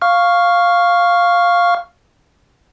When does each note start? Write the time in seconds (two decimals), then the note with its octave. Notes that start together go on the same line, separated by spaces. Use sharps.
0.02 F5 C#6 F6